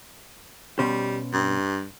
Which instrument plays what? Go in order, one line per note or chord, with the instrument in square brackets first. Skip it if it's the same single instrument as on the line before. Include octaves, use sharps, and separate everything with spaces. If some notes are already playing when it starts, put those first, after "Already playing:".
[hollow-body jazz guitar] B2 C#4 C5 [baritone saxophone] G3
[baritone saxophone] G2